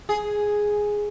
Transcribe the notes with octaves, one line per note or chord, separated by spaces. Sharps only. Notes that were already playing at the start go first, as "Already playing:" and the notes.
G#4